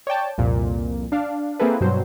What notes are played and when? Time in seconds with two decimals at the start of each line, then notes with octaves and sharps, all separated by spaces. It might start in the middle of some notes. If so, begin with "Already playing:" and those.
0.07 C#5 D5 G5 A5
0.38 C2 F2 A#2
1.12 D4 F5
1.59 A#3 C4 E4 G#4 A4 B4
1.81 G2 B2 F#3 C4 C5